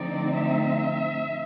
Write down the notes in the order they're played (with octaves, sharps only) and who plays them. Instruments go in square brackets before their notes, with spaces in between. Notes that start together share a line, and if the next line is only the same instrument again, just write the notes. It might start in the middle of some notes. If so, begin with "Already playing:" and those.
Already playing: [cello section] D3 F3 A3 C4 D#4 D5
E5